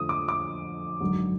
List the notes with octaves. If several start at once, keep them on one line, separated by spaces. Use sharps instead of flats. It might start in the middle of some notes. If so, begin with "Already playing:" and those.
Already playing: F2 D3 F3 A3 D#6
D6
D6
G#1 F#2 D3 F#3